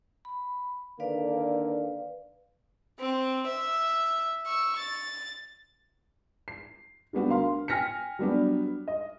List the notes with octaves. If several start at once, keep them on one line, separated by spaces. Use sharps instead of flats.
B5
D3 D#3 A#3 B4 D5 F5
C4
E5
C#6 E6
A6
C7
D3 G3 B3 F#4
D2 A#4 F5 C6
G5 G#5 F6 A#6 B6 C#7
F#3 G3 B3 D4
D#5